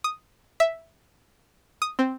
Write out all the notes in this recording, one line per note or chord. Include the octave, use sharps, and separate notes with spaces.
D#6
E5
D#6
C4